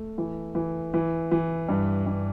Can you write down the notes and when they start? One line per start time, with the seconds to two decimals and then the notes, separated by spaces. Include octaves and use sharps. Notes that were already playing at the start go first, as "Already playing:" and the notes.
Already playing: A3
0.18 E3
0.55 E3
0.94 E3
1.31 E3
1.69 G2
2.06 G2